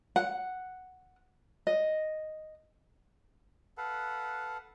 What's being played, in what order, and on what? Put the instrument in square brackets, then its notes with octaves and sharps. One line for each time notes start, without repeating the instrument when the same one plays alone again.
[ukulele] F#5
D#5
[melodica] A4 B4 F5 F#5